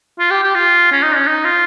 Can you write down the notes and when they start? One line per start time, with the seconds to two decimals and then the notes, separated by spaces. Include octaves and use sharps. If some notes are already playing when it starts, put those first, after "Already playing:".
0.19 F4
0.30 G4
0.44 G4
0.55 F4
0.92 C#4
1.03 D#4
1.16 C#4
1.27 D#4
1.45 F4